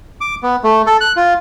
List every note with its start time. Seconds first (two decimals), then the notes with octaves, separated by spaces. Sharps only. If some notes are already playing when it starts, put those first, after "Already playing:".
0.21 D6
0.43 B3
0.64 A3
0.87 A4
1.01 F#6
1.16 F4